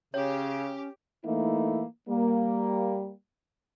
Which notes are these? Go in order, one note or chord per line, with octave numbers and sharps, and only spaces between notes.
C#3 C#4 G4 C#5
E3 A3 A#3 D#4 E4
G3 A#3